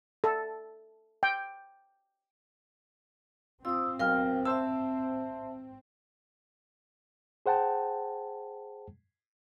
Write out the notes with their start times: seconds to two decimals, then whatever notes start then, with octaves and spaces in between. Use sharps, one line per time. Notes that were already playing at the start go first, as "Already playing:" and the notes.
0.24 A4
1.23 G5
3.65 C4 F4 D#6 E6
3.99 B1 A#4 F5 G5 F6
4.45 C5 E5 A5 E6
7.46 G#4 C5 F#5 G5 A5